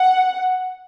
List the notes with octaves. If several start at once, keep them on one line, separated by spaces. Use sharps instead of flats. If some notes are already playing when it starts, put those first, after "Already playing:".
Already playing: F#5